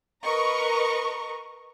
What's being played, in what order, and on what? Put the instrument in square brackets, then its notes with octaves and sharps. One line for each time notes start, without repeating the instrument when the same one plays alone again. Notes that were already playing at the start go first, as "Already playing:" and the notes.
[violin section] A#4 B4 D#5 A#5 C#6